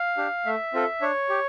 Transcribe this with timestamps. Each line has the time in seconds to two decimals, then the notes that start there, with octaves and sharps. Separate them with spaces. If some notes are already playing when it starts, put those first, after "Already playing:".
Already playing: F5
0.17 D4 G4
0.46 A3 E5
0.74 C4 F4 A4
1.01 D4 C#5
1.29 G4